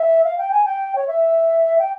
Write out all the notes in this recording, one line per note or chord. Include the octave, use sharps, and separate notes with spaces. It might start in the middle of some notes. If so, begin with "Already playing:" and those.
Already playing: E5
F5
G5
G#5
G5
C#5
E5
G5